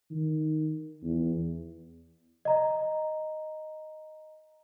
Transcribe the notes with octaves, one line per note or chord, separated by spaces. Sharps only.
D#3
E2
D#5 A#5